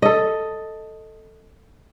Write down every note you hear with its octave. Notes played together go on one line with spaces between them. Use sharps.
A4 D#5